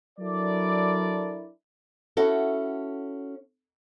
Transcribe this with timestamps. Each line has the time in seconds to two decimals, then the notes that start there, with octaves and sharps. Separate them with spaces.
0.19 F#3 D4 E4 A4 A#4 D5
2.17 C#4 E4 F#4 A4